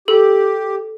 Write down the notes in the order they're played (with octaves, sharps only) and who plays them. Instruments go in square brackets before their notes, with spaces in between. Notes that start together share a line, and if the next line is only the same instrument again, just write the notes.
[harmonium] G4 [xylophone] A4